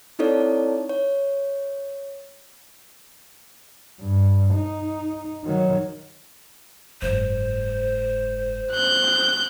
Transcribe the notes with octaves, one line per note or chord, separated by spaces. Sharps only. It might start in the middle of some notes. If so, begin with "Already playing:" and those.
C4 D#4 E4 A4 C#5 D5
C#5
G2
D#4
D#3 F#3
F#1 G#2 C5
F#6 G6